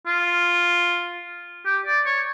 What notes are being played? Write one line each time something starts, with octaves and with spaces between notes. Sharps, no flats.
F4
G4
D5
C#5